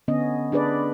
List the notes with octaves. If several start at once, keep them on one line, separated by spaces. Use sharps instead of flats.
D3 B3 C#4 D#5
D4 G#4 B4 D5